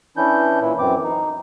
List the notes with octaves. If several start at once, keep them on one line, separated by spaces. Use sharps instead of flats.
E3 C#4 D4 E4 G6
A#2 E3 E4
F#2 E3 C4 D6
D#4